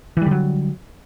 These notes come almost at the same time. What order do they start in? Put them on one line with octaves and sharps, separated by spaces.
E3 G3 D3 F#3